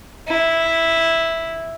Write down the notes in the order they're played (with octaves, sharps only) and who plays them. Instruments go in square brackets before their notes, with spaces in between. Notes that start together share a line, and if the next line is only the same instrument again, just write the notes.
[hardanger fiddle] E4